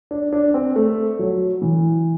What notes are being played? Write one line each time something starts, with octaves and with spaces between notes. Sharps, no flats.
D4
D4
C4
A3
F#3
E3